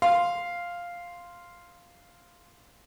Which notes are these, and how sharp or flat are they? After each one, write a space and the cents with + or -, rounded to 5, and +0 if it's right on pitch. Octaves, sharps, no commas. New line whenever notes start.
F5 +0 C6 +0